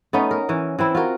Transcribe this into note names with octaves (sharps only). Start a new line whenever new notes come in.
A3 B3 C#4 D#4
A#4
E3 C#4
E3 C4 E4
F4 F#4 A#4